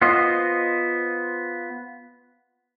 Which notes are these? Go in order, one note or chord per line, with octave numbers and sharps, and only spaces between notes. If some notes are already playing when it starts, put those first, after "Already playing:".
B3 F4 C5 D#5